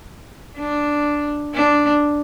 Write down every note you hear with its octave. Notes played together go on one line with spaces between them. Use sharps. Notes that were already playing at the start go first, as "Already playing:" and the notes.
D4
D4